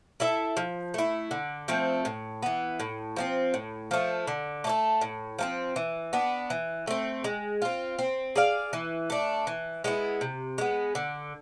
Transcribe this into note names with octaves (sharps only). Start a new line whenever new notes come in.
E4 A4 E5
F3
A3 E4
D3
F3 A3 C4
A2
E3 B3
A2
F3 A3 C4
A2
F3 A3
D3
A3 D4
A4
A2
F3 A3 C4
E3
B3 D4
E3
A3 C4
G#3
C4 F4
C4
G#4 D5 F5
E3
A3 D4
E3
G#3 B3 E4
C3
G#3 B3
D3